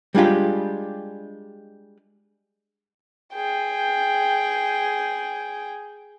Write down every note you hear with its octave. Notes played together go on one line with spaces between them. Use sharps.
G3 G#3 D4 F4 G4
G#4 G5